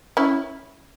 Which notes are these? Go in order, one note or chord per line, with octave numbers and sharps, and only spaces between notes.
C#4 E4